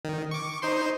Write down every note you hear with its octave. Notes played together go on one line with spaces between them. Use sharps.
D#3
C#6 D6
D#4 C5 C6